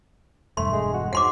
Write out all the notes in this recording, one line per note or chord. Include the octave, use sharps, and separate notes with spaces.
E1 G2 A3 C6
G#3
F#4
G#2 F#5 C6 D6